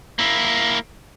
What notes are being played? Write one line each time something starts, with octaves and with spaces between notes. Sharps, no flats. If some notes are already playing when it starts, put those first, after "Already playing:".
A#3 E4